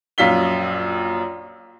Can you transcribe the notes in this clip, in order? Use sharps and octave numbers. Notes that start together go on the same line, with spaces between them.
A#1 F#2 F5 B6 G7